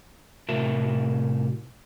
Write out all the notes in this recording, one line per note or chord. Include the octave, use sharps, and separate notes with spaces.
A2 C3 F#4 A#4 E5 A5